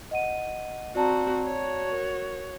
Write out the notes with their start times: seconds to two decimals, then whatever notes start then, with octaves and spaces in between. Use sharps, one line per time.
0.11 D#5 F#5 D#7
0.96 C4 F#4 D5 A5 A#5
1.46 F#4 C#5
1.91 A#4